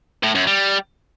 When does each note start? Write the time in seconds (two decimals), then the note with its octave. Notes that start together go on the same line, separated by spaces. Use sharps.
0.23 A2
0.35 F#2
0.47 G3